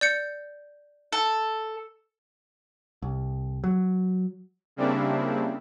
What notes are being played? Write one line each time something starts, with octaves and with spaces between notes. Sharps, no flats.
D5 G6 C#7
A4
C2
F#3
C#3 G3 A#3 C4 D4 E4